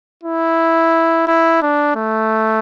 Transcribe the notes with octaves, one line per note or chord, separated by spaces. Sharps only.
E4
E4
D4
A3